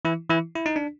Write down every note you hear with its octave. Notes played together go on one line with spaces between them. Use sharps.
E3 E4
E3 E4
E4
D#4
D4